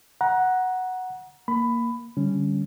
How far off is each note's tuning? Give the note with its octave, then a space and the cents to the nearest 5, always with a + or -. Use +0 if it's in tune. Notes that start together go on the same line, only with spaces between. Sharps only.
F#5 +0 A#5 +25
A#3 +0 B5 +15
D3 +0 G3 +0 C#4 +5